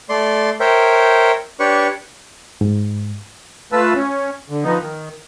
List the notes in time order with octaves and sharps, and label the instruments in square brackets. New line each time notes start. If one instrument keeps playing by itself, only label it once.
[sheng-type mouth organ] A3 D5 C6
A#4 C5 C#5 E5 G5
D4 G4 B4 C#5 C#6
[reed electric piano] G#2
[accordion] A3 F4 B4 A5 E6
C#4
D3
F3 B3 D#4
D#3